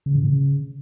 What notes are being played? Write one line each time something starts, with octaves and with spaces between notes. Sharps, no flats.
C#3
A2
C#3